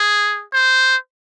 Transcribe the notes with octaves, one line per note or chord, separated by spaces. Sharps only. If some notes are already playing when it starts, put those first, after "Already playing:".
Already playing: G#4
C5